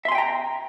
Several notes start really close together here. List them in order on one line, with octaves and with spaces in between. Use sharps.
E5 C6 G#5 G5 A#5